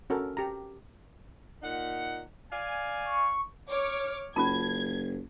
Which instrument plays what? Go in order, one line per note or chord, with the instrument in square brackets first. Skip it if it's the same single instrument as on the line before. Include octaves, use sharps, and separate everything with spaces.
[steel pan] C#4 F#4 A4 A#4
G4 A#5
[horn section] A#2 D#4 F#5
D5 F5 G#5
[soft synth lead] C#6
[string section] C#5 D6 F6
[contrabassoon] F#1 [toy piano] C#4 F4 A5 [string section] G#6